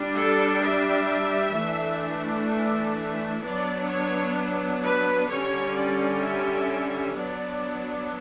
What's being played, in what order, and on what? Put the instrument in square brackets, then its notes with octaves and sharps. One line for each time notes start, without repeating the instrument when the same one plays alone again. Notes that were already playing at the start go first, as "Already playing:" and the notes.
Already playing: [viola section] G3 D4
A4
E5
E3 A3 D4
E5
E5
F#3 B3 D4 D5
C#5
B4
D3 G3 C#4 C#5
D5
E5
F#3 B3 D4 D5